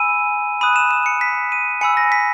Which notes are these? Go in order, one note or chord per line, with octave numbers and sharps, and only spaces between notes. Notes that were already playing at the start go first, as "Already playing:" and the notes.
Already playing: G#5 B5 E6 D#7
B5 D#6 F#6 D#7
E7
E7
C#7
B6
D#7
G#5 B5 E6 C#7
A#6
B6